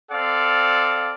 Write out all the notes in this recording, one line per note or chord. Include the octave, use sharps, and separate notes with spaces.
C4 A4 D5 F5